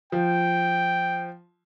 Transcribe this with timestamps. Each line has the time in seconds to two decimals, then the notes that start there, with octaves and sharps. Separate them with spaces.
0.12 F3 G5